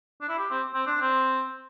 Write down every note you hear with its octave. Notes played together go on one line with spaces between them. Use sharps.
D4
E4
G4
C4
C4
D4
C4